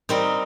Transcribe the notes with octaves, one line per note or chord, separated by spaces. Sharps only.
G3 C4 D#4 A#4